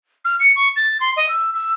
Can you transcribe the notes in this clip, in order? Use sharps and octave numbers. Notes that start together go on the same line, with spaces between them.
F6
C#7
C#6
A6
C6
D#5
E6
E6